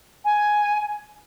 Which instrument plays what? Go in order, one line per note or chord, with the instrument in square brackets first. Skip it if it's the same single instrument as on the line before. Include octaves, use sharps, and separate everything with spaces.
[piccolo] G#5